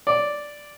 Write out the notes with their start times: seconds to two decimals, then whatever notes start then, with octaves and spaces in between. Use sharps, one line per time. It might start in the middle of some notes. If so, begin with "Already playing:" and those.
0.07 D5